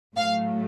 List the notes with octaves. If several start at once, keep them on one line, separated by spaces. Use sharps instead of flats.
A2 F#3 A3 F5